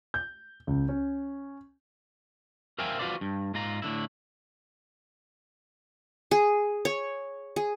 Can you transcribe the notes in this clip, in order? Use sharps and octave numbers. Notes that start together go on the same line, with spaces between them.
G6
C#2
C#4
A#4 C5 E5 F5 G5 G#5
F4 F#4 B4 C5 D5
G2
G#2 F4 A#5
A2 D3 E4
G#4
C#5
G#4